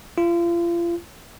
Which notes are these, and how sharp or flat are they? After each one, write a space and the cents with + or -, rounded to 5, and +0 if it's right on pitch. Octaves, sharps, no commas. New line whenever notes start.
F4 -35